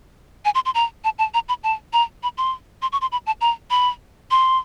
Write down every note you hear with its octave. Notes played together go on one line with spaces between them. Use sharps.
G#5
C6
C6
A#5
A5
A5
A#5
B5
A5
A#5
B5
C6
C6
C#6
C6
B5
A5
A#5
B5
C6